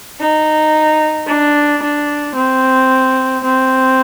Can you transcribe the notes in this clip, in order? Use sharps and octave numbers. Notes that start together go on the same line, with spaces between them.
D#4
D4
D4
C4
C4